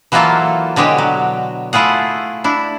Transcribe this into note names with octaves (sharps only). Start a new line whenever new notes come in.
E3 F#3 A#3 E4 F4 A4
B2 D3 G#3 G4 C#5
F#3
A3 E4 F4 G#4 F#5
D4 E4